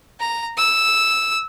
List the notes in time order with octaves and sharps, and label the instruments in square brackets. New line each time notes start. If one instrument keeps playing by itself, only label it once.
[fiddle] A#5
E6